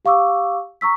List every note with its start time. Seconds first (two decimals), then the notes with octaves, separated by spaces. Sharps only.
0.05 G4 F5 C#6 D6 E6
0.81 A#5 C#6 E6 B6